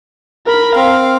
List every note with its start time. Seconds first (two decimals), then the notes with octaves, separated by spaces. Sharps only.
0.46 A#4 B5
0.75 C4 F5